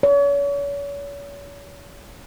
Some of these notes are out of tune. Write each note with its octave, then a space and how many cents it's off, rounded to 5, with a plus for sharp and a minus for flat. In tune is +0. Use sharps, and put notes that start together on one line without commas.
C#5 +40